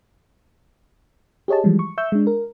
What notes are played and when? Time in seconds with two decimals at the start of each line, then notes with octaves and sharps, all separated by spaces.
1.48 G4 G#4 C#5 D#5 A5
1.64 E3 F3 G3 G#3
1.79 C#6
1.98 E5 C#6 E6 G6
2.12 G#3 D4
2.27 A#4